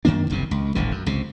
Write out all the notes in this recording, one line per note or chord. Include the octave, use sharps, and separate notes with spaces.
F#2 D#3 A#3 D4
F#1 C2 G2 C3
C#2
D#1 A1 D3
F#2
C#2 C3